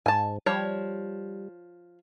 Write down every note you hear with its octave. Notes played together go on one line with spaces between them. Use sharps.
G#2 G#5 A5
F3 G3 C#5